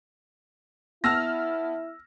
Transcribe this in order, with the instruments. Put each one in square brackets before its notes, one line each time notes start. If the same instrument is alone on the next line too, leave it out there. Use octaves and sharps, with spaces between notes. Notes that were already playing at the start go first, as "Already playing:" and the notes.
[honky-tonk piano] B3 A5 F6 [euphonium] E4 [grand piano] E6 A#6